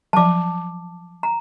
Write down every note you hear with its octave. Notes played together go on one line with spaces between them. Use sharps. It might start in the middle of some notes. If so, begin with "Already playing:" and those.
F3 F#3 A5 D6
A#5